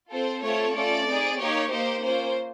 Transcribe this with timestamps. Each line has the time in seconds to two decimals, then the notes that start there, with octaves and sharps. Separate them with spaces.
0.11 C4 F4 A4 C5
0.42 A3 C4 F4 A4 C#5
0.75 A3 C#4 F4 A4 D5
1.06 C4 D#4 G#4
1.38 A#3 D#4 G4 C#5
1.70 A#3 D#4 G4 C5
2.01 A#3 C#4 F4 C5